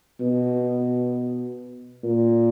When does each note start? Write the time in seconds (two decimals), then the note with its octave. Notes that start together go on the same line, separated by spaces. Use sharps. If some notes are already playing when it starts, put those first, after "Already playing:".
0.20 B2
2.03 A#2